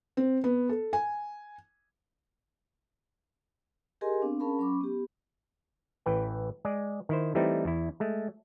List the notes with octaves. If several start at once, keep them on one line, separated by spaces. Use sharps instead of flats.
C4
B3
A4
G#5
G4 G#4 A#4 D#5 G#5 C6
B3 C4 D4 F5
C#4 G#4 A#4 F5 A5 B5
F#3 C#4 B5 C#6 D6
B3 G4
A1 E3 B4 G5
G#3 G#4 D5
D#3 E4 C5
E3 G3 A3 C4 D#4 E4
E2 E4
G#3 A3